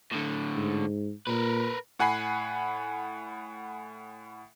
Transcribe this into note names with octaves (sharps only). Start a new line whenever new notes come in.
A2 D3
G#2
A#2 A#4 B4
A2 F#5 G#5 B5 C7